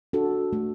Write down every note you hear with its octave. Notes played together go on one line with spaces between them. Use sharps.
D4 F#4 A4
A3